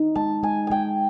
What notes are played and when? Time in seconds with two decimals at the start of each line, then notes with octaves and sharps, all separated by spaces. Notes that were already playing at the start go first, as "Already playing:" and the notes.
Already playing: D#4
0.15 G#3 A5
0.43 G#3 G#5
0.67 G#3 G5 G#5